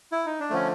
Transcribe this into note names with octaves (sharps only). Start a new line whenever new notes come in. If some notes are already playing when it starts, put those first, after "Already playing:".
E4
D#4
D4
D3 F3 A3 C#4